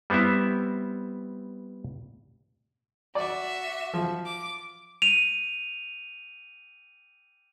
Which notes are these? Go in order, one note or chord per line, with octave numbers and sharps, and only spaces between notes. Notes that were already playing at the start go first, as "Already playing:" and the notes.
G3 B3 C4 E4 E5
F#4 D5 E5 D6
F3
D6
D#7 F7